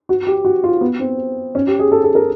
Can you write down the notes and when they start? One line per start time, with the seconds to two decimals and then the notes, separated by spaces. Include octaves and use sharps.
0.09 F#4
0.27 G4
0.45 F#4
0.64 F4
0.81 B3
1.00 C4
1.55 C#4
1.67 G4
1.79 G#4
1.92 A4
2.04 A4
2.15 A#4